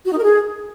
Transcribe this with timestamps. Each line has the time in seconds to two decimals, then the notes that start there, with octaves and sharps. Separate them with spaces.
0.07 F#4
0.12 D#4
0.18 A#4
0.24 G#4